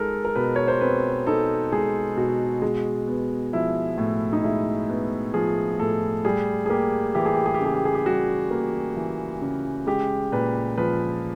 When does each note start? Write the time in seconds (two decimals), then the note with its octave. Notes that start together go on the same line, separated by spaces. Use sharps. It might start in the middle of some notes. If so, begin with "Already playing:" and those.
Already playing: G#3 D#4 A4 A#4
0.25 A#4
0.35 B2 B4
0.56 C#5
0.68 C5
0.81 C4 B4
1.27 D#4 A4
1.72 G#3 G#4
2.17 B2 F#4
2.62 G#3
3.08 B3
3.53 F3 E4
3.98 A2
4.33 D#4
4.44 G#3 E4
4.90 B3
5.34 F3 G#4
5.79 A2 A4
6.25 G3 G#4
6.66 G#4
6.70 A#3 G4
7.15 E3 G4
7.26 G#4
7.36 G4
7.46 G#4
7.54 G4
7.60 C#3 G#4
7.74 G4
7.85 G#4
7.95 G4
8.06 G3 F#4
8.51 A#3
8.97 E3
9.41 C#3
9.87 G#3 G4
10.32 A#2 B4
10.78 F3 B4